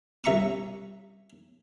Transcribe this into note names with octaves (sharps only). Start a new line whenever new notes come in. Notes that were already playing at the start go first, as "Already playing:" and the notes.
C2 E5 A#5 C#6 D#6